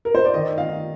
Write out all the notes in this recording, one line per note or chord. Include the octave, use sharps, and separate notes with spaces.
A#4
C5
D5
D#3 D#5
D#3 F5